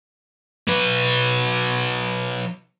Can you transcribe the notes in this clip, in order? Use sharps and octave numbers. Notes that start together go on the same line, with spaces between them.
F#3 B4